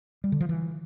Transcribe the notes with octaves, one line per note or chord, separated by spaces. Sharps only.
G3
D3
F3
E3